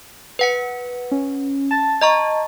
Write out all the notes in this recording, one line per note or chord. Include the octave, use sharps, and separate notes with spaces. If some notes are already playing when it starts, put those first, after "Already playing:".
B4 F#5 C#7
C#4
A5 A6
D#5 A#5 C#6